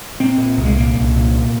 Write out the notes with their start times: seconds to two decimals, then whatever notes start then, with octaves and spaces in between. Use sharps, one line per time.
0.20 A#2 C4
0.38 A#2
0.57 C2
0.65 G#3
0.76 A#2 A#3
0.95 C2
1.14 A#2
1.33 C3